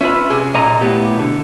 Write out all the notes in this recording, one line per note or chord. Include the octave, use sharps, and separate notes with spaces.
C#4 F4 B4 E5
C3 G#4
B1 A#2 D#5 A#5
A2 B3 G4
B2 D3